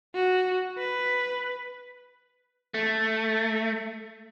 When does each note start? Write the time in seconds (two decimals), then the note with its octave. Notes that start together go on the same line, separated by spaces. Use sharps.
0.15 F#4
0.79 B4
2.74 A3